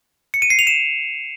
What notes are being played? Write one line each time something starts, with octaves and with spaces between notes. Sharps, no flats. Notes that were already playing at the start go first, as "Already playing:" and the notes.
C#7
D#7
C7
F7
E7